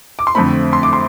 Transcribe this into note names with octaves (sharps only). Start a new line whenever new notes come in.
D6
C6
F2 D3 A3 C4 B5
C6
D6
C6